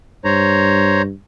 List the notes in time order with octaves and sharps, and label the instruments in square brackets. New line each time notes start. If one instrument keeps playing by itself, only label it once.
[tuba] G2 [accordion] C5 C#5 A#5